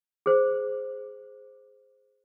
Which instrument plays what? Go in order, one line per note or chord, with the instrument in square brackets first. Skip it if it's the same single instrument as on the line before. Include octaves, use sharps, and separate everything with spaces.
[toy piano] G#4 C5